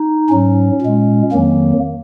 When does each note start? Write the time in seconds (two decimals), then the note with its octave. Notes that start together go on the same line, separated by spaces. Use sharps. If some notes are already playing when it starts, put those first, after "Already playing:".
Already playing: D#4
0.29 G#2 F#3 C#4
0.81 A#2 G#3
1.32 F2 D#3 F#3 A#3